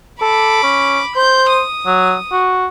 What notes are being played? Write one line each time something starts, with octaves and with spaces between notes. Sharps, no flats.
A4 B5 D6
C#4
C5 G6
D#6
F#3
F#4